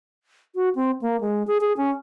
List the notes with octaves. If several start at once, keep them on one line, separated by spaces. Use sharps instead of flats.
F#4
C4
A#3
G#3
G#4
G#4
C#4